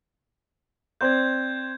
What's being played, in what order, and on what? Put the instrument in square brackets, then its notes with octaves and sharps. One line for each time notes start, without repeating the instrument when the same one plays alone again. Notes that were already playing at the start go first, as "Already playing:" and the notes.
[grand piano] C4 C5 D5 [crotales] G6 G#6